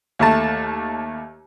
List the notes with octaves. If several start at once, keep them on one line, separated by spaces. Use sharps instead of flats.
D#2 A3 A5